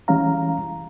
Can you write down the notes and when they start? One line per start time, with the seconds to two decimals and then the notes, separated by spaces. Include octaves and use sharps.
0.08 E3 G3 G#3 C#4 F5 A#5